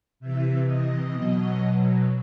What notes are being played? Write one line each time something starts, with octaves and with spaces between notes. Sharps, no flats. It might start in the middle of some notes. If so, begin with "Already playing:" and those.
C3 E3 E5
D#5
B2 F#3